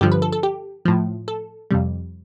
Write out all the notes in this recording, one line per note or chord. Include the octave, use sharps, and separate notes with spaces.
G2 D3 F3 G4
B4
A4
A4
G4
A2 F3
A4
F2 C3 G3